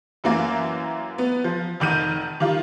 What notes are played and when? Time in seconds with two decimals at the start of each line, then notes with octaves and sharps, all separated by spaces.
0.24 F#2 E3 A#3
1.18 B3
1.44 F3
1.80 F1 D#3 G6 D#7
2.40 D#3 G3 F4